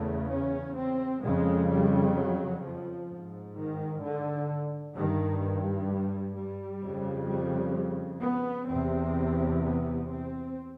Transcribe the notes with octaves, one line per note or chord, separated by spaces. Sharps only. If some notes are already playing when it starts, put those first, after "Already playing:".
Already playing: E2 C#3 A3
C#4
C4
F2 C#3 G#3
G3
F#3
F3
G#2
D#3
D3
G2 D#3
G3
G3
F2 C#3
G3
B3
E2 C3 C4
B3
C4